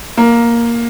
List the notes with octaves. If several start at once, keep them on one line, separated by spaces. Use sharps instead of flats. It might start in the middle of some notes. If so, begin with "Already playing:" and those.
A#3